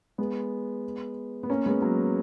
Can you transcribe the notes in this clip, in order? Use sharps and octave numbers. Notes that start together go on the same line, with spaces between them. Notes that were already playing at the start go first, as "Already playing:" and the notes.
G#3 B3
B3
A#3 C#4
G#3 B3
F#3 A#3